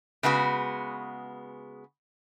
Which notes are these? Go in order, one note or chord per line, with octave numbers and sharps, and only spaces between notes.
C#3 G#3 B3 F#4